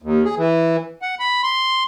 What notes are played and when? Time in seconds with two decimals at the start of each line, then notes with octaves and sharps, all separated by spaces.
0.02 D#2
0.25 G#4
0.38 E3
1.02 F#5
1.19 B5
1.43 C6